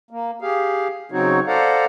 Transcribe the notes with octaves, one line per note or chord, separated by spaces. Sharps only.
A#3
G4 G#4 F5
C#3 F#3 C4 D#4 F#4 C#5
A4 C5 D5 F5 F#5 A#5